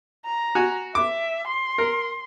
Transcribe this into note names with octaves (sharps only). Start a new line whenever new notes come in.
A#5
F#4 G#5
E5 D6
C6
A#4